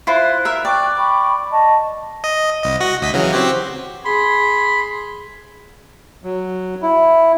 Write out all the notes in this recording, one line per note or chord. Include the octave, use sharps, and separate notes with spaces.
E4 F4 C5 F#6
A#4 E5
D5 G5 C#6 F#6
G5 B5 C#6
D#5 A5 C#6
D#5
C2 D#5
F#4 F#5 A#6
D2 D#5 B6
C#3 E3 F#3
C4 F#4 G4
G#4 B5 C6
F#3
E4